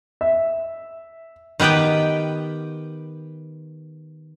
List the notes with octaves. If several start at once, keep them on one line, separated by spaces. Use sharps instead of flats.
E5
D#3 B3 G4 B4 G5